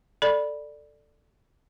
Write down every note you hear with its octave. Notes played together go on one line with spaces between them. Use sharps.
A4 D5 B5